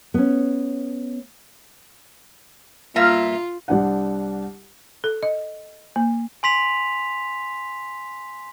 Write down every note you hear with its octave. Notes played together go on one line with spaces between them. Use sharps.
B3 C#4
G2 A#3 F4 E5
C2 D4 F#5
A4
D#5
A#3
G#5 C6 B6 F7